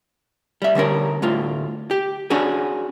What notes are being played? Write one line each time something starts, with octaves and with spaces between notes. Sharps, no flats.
G3 E5
D3 G3 C#4 A#4
D2 A2 F4
G4
C#4 D4 F#4 G#4